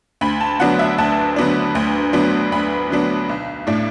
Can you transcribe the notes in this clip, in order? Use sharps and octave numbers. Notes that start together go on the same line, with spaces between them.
D2 B5
A5
D3 F#3 B3 D4 F#5
E5
D2 A5
D3 F#3 B3 D4
D2
D3 F#3 B3 D4
D2 B5
D3 F#3 B3 D4
B1
A2 A3 D4